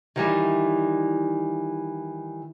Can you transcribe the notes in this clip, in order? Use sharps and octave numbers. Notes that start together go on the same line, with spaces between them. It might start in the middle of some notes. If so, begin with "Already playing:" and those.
D#3 E3 G3